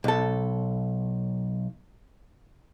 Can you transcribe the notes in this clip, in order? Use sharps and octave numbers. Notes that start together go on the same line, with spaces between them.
B1 A4